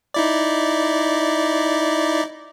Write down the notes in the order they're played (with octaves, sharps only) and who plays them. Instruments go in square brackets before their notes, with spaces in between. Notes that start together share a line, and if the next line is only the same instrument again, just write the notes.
[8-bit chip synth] D#4 E4 D5